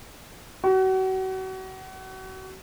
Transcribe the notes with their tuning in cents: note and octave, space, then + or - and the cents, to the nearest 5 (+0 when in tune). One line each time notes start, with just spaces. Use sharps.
F#4 +35